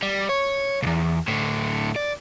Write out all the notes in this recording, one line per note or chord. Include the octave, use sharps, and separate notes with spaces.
G3
C#5
B1 E2
A2 D3
D5